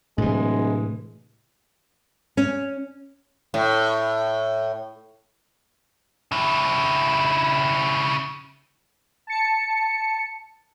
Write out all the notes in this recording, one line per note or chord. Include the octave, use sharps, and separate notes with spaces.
D1 A2 C3 E3 G#3
C#4
A2
C#3 E4
A5 C#7